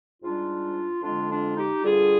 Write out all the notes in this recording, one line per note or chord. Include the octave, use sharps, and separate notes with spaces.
G#2 G3 D4 F4
F2 D3 G#3 D4 F4
D4 F4
D#4 G4
G2 D3 G3 F4 G#4